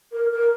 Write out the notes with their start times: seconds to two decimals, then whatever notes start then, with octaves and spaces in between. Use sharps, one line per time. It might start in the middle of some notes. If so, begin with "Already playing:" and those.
0.12 A#4
0.30 A#4